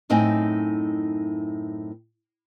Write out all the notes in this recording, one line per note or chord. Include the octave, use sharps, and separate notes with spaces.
F#2 A2 C4 D#4 G5 G#5